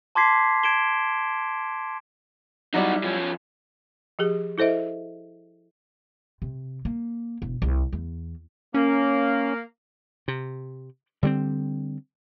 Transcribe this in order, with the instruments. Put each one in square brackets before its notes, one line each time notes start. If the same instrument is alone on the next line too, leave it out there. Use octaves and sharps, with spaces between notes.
[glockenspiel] A5 C6 D6 G#6 B6 C7
G#6 D7 E7 G7
[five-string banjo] F#3 G3 E4 [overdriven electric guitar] D#4 F#4
[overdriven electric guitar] F3 C#4
[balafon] F3 G4 G#4
E4 A4 C5 D#5 E5
[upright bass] C3
A#3
E1
C2
E2
[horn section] A#3 [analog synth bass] C#4
[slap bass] C3
D3 G3 A3 C4